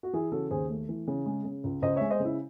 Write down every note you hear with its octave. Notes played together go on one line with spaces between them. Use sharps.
F#4
E3 E4 G#4
C#3 F#4 A4
D#2 G#4 C5
A3
E3
C#3
G#3
C#3
C#2
C#2 C5 D#5
G#3 C#5 E5
C5 D#5
C#3 E4